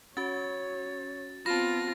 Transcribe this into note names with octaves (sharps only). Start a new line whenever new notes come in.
C#4 F#4 C#5 A6
B3 C4 F4 A5 B5 A#6